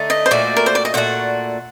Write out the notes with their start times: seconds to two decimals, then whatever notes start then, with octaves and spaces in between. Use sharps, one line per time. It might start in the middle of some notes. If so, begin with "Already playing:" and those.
Already playing: D3 A3 D#4
0.10 D#5
0.26 C5
0.31 A#2 A3 D4 F#4 D5
0.57 A#4
0.66 C5
0.75 D5
0.85 D#5
0.94 A#2 A3 D4 F#4 F#5